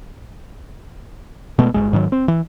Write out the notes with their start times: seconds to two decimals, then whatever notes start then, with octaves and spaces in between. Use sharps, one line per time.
1.59 B2 G#3 A3 B3
1.74 G1 E2 G#3
1.93 G#2 D#3 F3 F#3
2.12 C4
2.28 E3